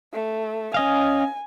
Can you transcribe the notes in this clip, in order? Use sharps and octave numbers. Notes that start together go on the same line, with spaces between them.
A3
C#4 D#5 F5 G#5